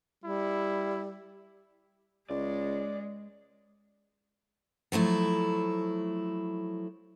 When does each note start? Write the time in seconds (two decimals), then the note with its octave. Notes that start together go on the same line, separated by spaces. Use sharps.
0.24 G3 E4
2.30 C#2 G#3 D5
4.92 F3 F#3 A3 E4